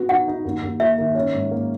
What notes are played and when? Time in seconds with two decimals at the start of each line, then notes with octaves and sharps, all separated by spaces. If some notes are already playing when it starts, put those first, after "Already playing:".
Already playing: B3 F#4
0.09 D#4 F#5
0.28 D#4
0.45 D#2
0.62 D#2
0.80 A#3 E5
0.98 D#3
1.15 C#4
1.33 G#2
1.51 A#3